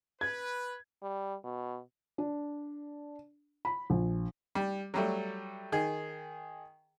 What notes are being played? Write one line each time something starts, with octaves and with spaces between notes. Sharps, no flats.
B4 G#6
G3
B2
D4
B5
A#1
G3
F#3 G3 A3
D#3 G#4